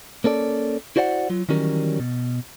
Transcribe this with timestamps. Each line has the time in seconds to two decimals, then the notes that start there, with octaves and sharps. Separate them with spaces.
0.24 A#3 C#4 A4 D5
0.96 E4 F#4 C5 D5 F5 F#5
1.30 F#3 F4
1.49 D#3 E3 F#3 G3 C#4 A#4
2.00 B2